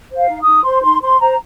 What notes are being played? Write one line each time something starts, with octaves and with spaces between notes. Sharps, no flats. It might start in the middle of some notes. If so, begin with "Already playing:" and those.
C5
F5
D#4
D#6
D#4
C5 C6
D#4 C6
C5 C6
C5 A#5